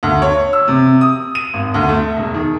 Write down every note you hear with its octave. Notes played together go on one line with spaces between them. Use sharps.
D2
C#5
E6
C3
D#6
D#7
G#1
D2
A3
E1
D#3